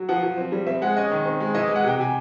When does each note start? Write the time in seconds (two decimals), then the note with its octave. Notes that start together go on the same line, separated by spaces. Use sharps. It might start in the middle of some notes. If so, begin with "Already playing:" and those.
Already playing: F#3
0.09 F3 F#5
0.23 F3
0.38 C4
0.52 G3
0.67 C4 E5
0.82 G#3 F#5
0.97 C#4 D#5
1.11 D#3
1.25 C4
1.40 G#3
1.55 E3 D#5
1.69 G#3
1.76 F#5
1.84 C3 G5
1.98 C3 G#5